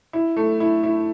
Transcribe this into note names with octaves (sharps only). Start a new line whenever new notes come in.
E4
A3
E4
E4